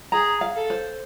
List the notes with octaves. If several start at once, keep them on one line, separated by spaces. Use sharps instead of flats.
G#4 A#5
F5
A4
C5